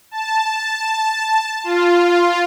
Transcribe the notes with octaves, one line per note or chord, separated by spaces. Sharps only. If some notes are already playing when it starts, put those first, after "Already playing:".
A5
F4